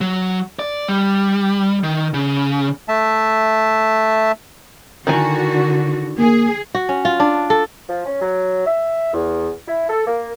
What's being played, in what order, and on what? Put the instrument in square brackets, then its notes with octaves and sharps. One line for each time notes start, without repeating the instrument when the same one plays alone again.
[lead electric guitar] F#3
D5
G3
D#3
C#3
[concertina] A3 E5 A5
[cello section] D3 F#4 [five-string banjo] D#3 E4 G#5
[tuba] A#3 [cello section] G#4
[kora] F#4
C#4
F4
D4
A4
[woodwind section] F3
C#4
F#3
E5
E2
E4
A4
A#3